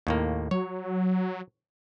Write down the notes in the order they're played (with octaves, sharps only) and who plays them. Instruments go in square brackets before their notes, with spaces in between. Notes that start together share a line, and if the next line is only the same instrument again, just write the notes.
[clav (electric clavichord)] D#2 A2 A#3
[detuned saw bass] F#3 [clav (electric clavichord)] C#5